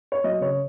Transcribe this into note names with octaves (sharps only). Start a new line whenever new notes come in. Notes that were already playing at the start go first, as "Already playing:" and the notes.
C#5
F#3 D#5
C#3 C#5